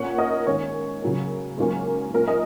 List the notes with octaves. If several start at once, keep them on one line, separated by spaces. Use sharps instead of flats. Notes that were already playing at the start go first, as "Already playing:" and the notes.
Already playing: A#2 A#3 C#4 C#5 F#5
A#4 D#5
G#2 D#3 A#3 C#4 C#5
C#3 F#3 A#3
G#2 F#3 A#3 C#4
A#2 A#3 C#4 A#4
A#4 D#5